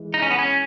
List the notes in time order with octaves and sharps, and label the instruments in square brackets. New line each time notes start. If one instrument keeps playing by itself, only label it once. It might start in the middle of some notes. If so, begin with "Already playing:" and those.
Already playing: [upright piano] E3 G#3
[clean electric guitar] D#4
C#4
B3
C#4